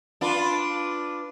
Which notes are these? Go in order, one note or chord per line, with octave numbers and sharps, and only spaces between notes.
D4 F4 B4